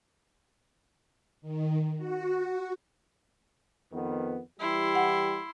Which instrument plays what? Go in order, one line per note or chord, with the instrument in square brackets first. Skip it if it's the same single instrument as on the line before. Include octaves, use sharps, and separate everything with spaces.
[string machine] D#3
F#4
[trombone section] F2 D#3 B3
[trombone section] E3 G3 G4 [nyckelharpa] E4 C6
[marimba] F#5